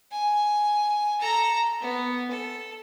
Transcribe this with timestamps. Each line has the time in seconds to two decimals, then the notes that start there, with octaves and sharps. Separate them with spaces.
0.12 G#5
1.20 A4 A#5
1.81 B3
2.30 A4